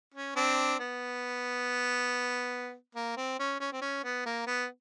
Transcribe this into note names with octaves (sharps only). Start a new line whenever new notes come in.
C#4
C4 D4
B3
A#3
C4
C#4
C#4
C4
C#4
B3
A#3
B3